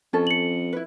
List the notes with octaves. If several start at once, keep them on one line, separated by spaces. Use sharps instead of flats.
F2 C#4 A4
C#7 F#7
E4 B4